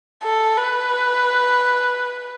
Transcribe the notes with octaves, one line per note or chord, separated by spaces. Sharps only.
A4
B4